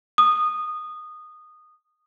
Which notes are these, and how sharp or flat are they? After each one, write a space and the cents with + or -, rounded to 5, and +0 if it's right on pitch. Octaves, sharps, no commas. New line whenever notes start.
D#6 -15